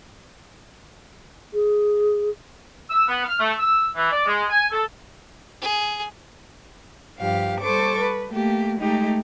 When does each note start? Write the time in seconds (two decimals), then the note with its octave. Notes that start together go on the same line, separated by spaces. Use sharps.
1.54 G#4
2.89 E6
3.08 B3
3.25 F6
3.40 A3
3.59 E6
3.96 E3
4.11 D5
4.27 G#3
4.49 G#5
4.72 A4
5.62 G#4
7.19 G2 F3 G4 F5
7.60 G3 A4 C5 C#6 D6
7.98 B4
8.30 A3 A#3 G4
8.79 G#3 A3 D#4 G4